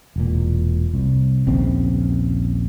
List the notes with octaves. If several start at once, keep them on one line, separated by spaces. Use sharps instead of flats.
E1 A#2
C2
A#1 D#2 C#3 C4